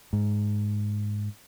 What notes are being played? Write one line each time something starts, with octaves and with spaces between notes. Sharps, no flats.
G#2